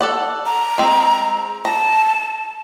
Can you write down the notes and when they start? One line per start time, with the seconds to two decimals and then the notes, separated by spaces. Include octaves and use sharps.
0.01 A4 D5 F#5
0.46 A#5
0.78 G#3 C4
1.65 A5 A#5